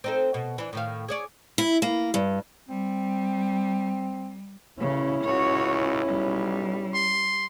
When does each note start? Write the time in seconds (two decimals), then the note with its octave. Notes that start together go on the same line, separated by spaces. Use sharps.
0.04 C4 D#4 A4
0.34 B2
0.58 E3 D4
0.73 A2 D#3 F5
1.08 G#4 C#5 D5
1.58 E4
1.82 A#3
2.14 G2
2.69 G3 C4
4.80 A1 C#3 C#4 E4
5.24 C#2 F#4 C#5
6.05 B1 G3
6.94 C6